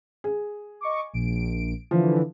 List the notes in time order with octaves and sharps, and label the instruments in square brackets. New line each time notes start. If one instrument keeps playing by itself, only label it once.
[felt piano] G#4
[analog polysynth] D#5 C#6 D6
A#1 D7
[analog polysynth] D3 E3 [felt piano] F3